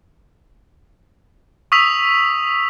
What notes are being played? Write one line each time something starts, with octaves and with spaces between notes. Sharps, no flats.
C#6 D#6 E6 B6 F7